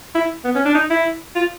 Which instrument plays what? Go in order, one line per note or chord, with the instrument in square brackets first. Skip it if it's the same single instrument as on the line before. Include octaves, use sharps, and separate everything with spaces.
[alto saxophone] E4
B3
C#4
D4
D#4
E4
F4